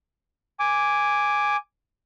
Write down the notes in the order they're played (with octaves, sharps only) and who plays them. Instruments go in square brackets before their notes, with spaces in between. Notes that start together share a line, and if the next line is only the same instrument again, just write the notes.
[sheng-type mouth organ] G#5 D6